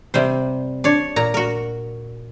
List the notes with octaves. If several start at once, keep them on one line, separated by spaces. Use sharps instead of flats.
C3 G3 C5
D4 C#5
A#2 A#5
F#4 A#4